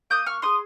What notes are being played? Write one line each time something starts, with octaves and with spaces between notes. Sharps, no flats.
A#3 D#6 G6
C#6 F6
D#4 G#4 C6 D#6